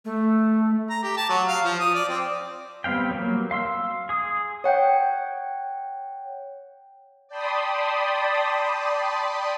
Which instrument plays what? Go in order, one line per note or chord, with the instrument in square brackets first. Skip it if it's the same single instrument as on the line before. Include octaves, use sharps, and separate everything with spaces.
[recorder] A3
[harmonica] A#5
G4
A5
F#3
F5
F3
D#6
D5
C4
[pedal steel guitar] G3 B3 C4 F5 G5
F#3 A#3
F5 C6 E6
G#4 D#6
[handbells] C#5 F#5 G5 G6
[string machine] D5 G5 A5 B5 C6 D#6